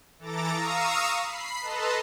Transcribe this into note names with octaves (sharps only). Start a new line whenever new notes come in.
E3 A4 A#5 D6 A6
F5 A#5 C#6 D#6 E6
B5 C7
A4 B4 D#5 A5 A#5 C6